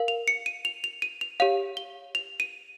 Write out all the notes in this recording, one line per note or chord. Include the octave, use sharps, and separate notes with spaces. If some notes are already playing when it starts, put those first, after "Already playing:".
Already playing: A#4 F5
F7
C#7
D#7
F7
F7
D#7
F7
G4 C#5 F5 F7
G7
F7
D#7